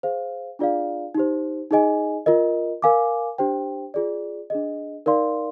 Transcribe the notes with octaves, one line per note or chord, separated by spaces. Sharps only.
G#4 C5 F5
D4 F4 G#4 D5 F5
D#4 G4 C5
D#4 G#4 D#5 G#5
F4 A#4 D#5
A#4 F5 G#5 D6
D4 G4 C5 G5
F4 G#4 D5
D4 G#4 D#5
D#4 A#4 D5 F5 C6